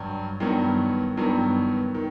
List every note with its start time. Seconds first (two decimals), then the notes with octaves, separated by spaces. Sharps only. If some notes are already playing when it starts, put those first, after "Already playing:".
Already playing: G2 F#3
0.40 G2 D#3 F#3 B3
1.17 G2 D#3 F#3 B3
1.94 D#3